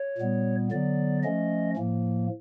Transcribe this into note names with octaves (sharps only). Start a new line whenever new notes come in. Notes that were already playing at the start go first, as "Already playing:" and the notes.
Already playing: C#5
A#2 G3 B3
D3 F#3 B3 D5
F3 A3 C#4 D#5
A2 F3 A#3